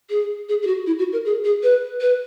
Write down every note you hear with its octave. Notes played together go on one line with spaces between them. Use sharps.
G#4
G#4
G#4
F#4
E4
F#4
A#4
G#4
G#4
B4
B4